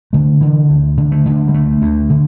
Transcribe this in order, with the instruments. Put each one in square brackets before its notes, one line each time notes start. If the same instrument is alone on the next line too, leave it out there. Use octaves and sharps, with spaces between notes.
[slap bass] D3 A3
D3 E3
D2
D3
A3
D3
G3
D2 A3
D2
D3